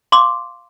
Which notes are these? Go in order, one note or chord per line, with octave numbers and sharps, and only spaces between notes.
F5 C6 D6